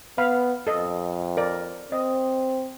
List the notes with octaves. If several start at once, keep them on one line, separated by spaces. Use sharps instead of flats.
B3 F5 B5
F2 A4 D#5
A#4 D5
C4 D#5